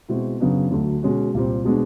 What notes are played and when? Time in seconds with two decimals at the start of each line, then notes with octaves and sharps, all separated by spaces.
0.08 B2 G#3 C4 E4
0.40 F#2 C#3 F#3 B3 D4
0.71 D2 D3 F#3 A3
1.03 B2 G#3 C#4 F#4
1.34 C2 A#2 G3 C4
1.65 B2 G#3 B3 D4